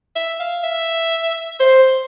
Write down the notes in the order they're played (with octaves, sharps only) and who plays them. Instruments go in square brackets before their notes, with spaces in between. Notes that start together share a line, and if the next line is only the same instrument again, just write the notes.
[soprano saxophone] E5
F5
E5
C5